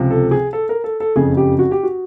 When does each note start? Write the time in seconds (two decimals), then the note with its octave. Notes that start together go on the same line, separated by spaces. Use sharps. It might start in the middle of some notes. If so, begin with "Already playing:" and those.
Already playing: C#2 C3 F3
0.11 A4
0.31 G#4
0.53 A4
0.69 A#4
0.84 A4
1.00 A4
1.16 F#1 F2 C#3 G#4
1.37 G4
1.59 F#4
1.71 G4
1.83 F#4